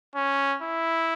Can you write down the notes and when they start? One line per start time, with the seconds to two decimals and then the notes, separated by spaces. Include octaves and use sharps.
0.15 C#4
0.62 E4